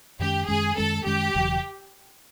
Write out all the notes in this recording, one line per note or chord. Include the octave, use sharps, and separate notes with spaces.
F#2 D#3 G#3 C#4 G4
F#2 D#3 G#3 C#4 G#4
F#2 D#3 G#3 C#4 A4
F#2 D#3 G#3 C#4 G4
E1 E2 C#3 F#3